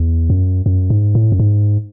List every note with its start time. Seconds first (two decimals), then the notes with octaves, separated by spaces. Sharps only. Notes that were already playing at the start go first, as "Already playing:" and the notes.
Already playing: E2
0.30 F#2
0.66 F#2
0.90 G#2
1.15 A2
1.32 F#2
1.39 G#2